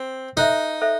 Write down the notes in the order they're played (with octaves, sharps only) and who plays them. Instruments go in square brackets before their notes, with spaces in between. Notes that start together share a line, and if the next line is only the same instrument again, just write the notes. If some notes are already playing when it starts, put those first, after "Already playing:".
Already playing: [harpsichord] C4
[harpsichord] D#4 [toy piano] A4 C5 E5
[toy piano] A4 C5 E5